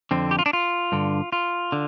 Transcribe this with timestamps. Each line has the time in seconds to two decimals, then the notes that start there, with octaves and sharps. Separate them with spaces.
0.11 F2 D3 C4
0.31 G4
0.39 F4
0.46 D4
0.53 F4
0.92 G2 D3
1.32 F4
1.72 D3